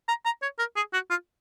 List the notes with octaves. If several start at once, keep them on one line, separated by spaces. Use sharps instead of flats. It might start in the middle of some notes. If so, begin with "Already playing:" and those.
A#5
A#5
C#5
A#4
G#4
F#4
F4